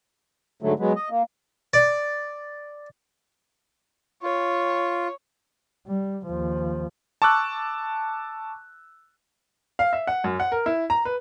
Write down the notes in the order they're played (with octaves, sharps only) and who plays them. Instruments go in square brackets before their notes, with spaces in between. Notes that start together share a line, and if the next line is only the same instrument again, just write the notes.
[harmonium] G#2 D3 F#3 A3
F#3 G#3 B3
D#5
A#3
[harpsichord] D5
[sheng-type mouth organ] F4 [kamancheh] C#5
[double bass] G3
D#2 F3
[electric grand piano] A5 C#6 D6 E6 F#6
[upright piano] F5
E5
F#5
F#2
F#5
A#4
E4
A#5
B4